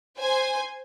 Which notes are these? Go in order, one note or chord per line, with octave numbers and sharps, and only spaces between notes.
C5 G#5